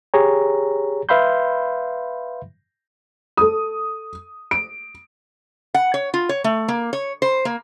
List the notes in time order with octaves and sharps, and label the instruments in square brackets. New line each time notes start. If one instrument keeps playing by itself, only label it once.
[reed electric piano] G4 G#4 C#5 A#5
B4 E5 F5 B5 C6 G6
[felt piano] A4 D#6
D7
[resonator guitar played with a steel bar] F#5
C#5
F4
C#5
A3
A#3
C#5
C5
A#3